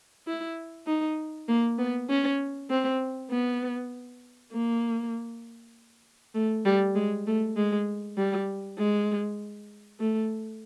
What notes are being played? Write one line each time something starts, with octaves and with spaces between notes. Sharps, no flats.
E4
D#4
A#3
B3
C#4
C4
B3
A#3
A3
G3
G#3
A3
G#3
G3
G#3
A3